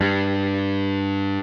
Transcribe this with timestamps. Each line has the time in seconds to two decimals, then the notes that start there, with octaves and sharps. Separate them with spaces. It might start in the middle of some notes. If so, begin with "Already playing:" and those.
0.01 G2